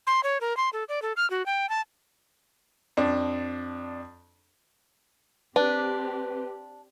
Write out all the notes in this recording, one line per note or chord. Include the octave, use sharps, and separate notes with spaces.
C6
C#5
A#4
C6
A4
D5
A4
F6
F#4
G5
A5
F2 D4
C4 D4 G4 B4